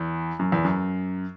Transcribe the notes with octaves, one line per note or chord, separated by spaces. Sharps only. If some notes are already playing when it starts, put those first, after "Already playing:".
Already playing: E2
F#2
E2
F#2